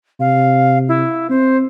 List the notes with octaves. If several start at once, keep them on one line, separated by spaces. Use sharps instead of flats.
C3 F5
E4
C4 C5